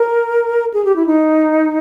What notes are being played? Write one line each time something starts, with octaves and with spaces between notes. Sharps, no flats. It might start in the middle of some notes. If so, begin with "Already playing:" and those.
Already playing: A#4
G#4
G4
E4
D#4